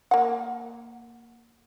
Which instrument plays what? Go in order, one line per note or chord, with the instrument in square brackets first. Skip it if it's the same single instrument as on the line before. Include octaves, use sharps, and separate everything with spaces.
[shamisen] A#3 F#5